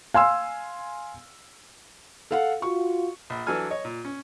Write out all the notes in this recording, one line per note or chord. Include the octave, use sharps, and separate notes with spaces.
F5 G#5 C6 E6
A4 F5 F#5
F4 F#4 C#6
A#1
E3 F#3 D4 A4 G#5 F6
C#5 D#5
A#2
C#4